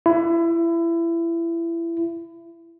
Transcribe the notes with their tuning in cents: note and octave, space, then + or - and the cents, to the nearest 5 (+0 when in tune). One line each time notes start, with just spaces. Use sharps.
E4 +25